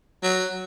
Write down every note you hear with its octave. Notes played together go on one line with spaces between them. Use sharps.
F#3